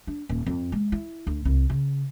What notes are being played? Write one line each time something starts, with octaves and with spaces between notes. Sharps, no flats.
D4
D#1
F2
G#3
E4
D2
C2
C#3